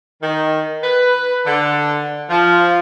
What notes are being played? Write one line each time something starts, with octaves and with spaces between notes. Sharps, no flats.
D#3
B4
D3
F3